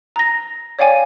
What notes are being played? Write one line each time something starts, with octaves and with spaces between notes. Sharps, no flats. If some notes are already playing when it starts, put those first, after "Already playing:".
A#5 A#6
C#5 D5 F5 G5 G#5